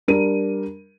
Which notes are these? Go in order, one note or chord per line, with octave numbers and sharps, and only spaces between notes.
G3 D4 A#4 D#7